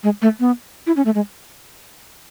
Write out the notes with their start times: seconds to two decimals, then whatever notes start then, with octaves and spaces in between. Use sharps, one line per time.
0.04 G#3
0.22 A3
0.40 B3
0.87 E4
0.97 C#4
1.05 A3
1.15 G#3